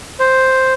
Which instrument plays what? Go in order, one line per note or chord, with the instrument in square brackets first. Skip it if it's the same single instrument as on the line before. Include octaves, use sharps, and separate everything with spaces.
[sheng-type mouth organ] C5